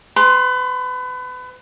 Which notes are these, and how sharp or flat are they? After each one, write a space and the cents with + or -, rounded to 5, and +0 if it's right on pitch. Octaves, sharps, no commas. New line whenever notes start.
B4 +30 C6 +0